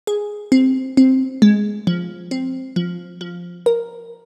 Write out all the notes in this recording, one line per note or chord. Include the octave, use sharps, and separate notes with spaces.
G#4
C4
C4
G#3
F3
C4
F3
F3
A#4